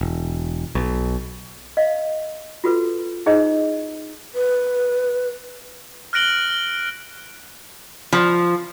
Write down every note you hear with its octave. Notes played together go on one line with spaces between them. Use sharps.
E1
B1
D#5 F5
F4 F#4 A4 B4
D#4 E4 G#4 C5 D#5
B4
F6 F#6 A#6 D7 F#7 G7
F3